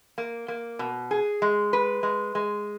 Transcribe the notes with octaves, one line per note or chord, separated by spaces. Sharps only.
A#3
A#3
B2
G#4
G#3
B4
G#3
G#3